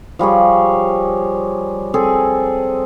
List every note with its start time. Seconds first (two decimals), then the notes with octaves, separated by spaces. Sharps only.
0.19 F3 G3 G#4 C#5
1.94 C4 G#4 A4